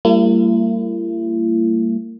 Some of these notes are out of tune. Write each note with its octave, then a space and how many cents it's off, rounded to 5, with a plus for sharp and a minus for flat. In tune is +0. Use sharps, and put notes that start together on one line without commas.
G3 +0 A#3 -40 E4 +35